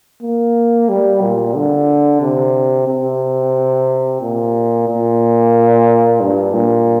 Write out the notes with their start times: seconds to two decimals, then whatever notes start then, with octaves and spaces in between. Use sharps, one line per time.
0.22 A#3
0.89 G3
1.22 A#2
1.55 D3
2.22 C3
2.88 C3
4.21 A#2
4.88 A#2
6.21 G2
6.54 A#2